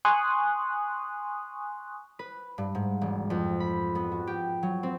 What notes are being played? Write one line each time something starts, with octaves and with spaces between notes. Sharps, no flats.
G#5 C6 C#6 D#6 F#6
B4
G2
G#2
E1
F2
B5
B3
F#4
G4
F#3
C4